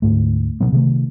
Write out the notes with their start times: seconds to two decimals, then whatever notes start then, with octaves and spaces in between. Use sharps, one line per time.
0.02 D2 G#2 A3
0.60 B2 F#3 B3
0.72 C3 D#3 A3